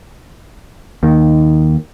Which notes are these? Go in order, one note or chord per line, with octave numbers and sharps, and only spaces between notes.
D#2 D#3